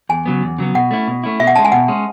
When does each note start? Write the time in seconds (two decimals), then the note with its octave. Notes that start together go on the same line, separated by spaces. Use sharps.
0.09 E2 G#5
0.26 C#3 F#3 B3
0.43 E2
0.58 C#3 F#3 B3
0.75 B2 F#5
0.91 A3 C#4 E4
1.08 B2
1.24 A3 C#4 E4
1.40 B2 E5
1.47 F#5
1.55 G#3 C#4 A5
1.65 G#5
1.72 B2 F#5
1.88 G#3 C#4